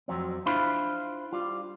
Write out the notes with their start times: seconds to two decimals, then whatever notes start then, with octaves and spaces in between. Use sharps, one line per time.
0.08 F2 G#2 F#3 C4
0.46 D4 E4 F4 C5 B5
1.33 G3 F4